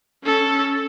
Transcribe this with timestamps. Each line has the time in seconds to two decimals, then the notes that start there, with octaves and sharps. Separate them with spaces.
0.24 C#4 A4